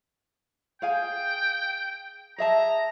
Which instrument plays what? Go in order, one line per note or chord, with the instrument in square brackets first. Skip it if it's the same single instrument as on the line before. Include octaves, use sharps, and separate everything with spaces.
[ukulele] G#4 F5 G#5 [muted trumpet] G5
[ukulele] G#4 E5 A5 [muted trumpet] A#5